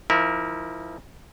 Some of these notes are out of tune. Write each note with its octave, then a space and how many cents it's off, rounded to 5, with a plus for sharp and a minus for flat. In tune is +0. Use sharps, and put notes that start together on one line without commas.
F3 -25 E4 -35 A#4 +0